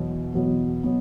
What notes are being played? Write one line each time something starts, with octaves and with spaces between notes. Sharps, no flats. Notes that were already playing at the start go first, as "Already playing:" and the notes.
Already playing: E2 B2 F#3 B3
E2 B2 F#3 B3
B2 F#3 B3